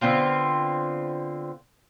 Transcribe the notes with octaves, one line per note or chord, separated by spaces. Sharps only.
D3 B3 C4 F4